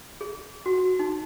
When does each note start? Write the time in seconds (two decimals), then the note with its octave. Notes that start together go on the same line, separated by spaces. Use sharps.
0.21 G#4
0.66 F#4
0.99 D#4